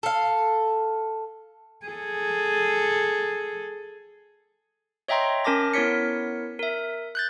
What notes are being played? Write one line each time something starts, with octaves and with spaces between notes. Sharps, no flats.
A4 F5
G#4 A4
C#5 D#5 E5 G5 A#5 C6
C#4 A#4 A5 D6 A#6
B3 E4 A#4 C#5 B6 C#7
A#4 E5
F#6 G6 A6